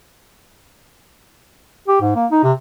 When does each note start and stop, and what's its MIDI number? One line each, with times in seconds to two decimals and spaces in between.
1.88 2.01 67
2.01 2.13 44
2.15 2.26 58
2.31 2.43 63
2.43 2.52 48